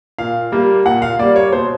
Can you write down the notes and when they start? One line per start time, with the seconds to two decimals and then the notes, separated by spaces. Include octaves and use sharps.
0.18 A#2 F5
0.52 G3 A#3
0.85 A#2 F#5
1.02 F5
1.19 G3 A#3 D5
1.36 C#5
1.52 B2 C5